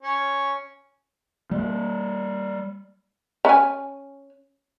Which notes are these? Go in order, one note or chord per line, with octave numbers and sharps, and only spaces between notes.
C#4
G3 A#3
C#4 G#5